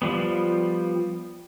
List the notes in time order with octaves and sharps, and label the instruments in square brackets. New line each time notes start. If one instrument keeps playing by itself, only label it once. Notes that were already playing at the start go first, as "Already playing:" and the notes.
[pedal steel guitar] F3 G3 B3